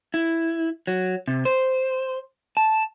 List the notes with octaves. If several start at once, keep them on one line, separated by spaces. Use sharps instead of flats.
E4
F#3
C3
C5
A5